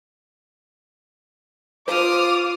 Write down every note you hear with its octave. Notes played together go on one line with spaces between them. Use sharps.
F4 C5 D6 D#6 F6